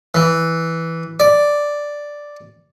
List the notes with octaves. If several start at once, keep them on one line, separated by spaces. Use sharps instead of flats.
E3
D5